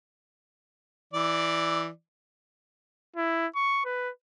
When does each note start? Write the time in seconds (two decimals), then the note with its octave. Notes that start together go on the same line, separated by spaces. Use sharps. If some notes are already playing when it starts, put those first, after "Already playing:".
1.13 E3 D5
3.16 E4
3.56 C#6
3.85 B4